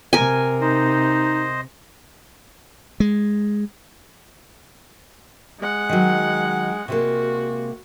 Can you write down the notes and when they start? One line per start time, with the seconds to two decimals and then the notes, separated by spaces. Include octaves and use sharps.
0.13 C3 A#4 G#5
0.61 D#4 C5 D#5
3.00 G#3
5.59 G#3 F#5
5.89 D#3 F#3
6.88 C3 G#3 A#3 F#4